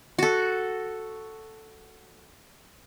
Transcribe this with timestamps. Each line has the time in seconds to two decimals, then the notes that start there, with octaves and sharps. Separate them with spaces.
0.19 F#4 A4